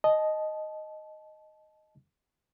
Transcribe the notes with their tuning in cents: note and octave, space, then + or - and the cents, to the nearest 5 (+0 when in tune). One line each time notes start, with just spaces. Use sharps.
D#5 +0 A5 -25